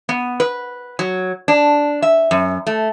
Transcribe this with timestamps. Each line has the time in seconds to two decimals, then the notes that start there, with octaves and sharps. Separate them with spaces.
0.09 B3
0.40 B4
0.99 F#3
1.48 D4
2.02 E5
2.31 F#2
2.67 A3